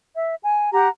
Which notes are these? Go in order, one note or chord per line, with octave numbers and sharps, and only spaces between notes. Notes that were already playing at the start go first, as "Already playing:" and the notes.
E5
G#5
G4 F#5 A#5